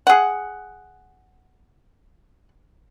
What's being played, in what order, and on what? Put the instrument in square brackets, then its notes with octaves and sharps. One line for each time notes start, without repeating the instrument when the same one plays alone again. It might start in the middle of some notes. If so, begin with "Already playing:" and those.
[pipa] G#4 F#5